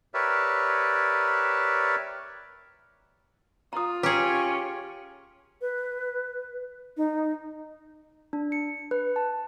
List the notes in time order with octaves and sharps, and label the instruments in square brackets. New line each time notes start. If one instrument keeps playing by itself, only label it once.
[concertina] G4 A#4 B4 C#5 D5 E5
[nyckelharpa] F4 [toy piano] A#5 D#6
[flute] C#4 [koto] G4 G#4 [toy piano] B4 A#5
[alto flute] B4
D#4
[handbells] D4
C#7
B4
A5